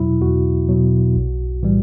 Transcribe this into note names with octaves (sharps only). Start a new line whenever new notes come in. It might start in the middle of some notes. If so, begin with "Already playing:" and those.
Already playing: E2 B2 F#3 E4
E2 F#4
B2 F#3
B1
A2 E3 G3